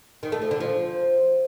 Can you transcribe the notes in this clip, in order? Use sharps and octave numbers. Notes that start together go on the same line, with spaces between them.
D#3
A3
F3
D3
F3